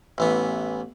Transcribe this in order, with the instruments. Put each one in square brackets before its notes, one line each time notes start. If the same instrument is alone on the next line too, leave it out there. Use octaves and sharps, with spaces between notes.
[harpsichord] A1 E3 B3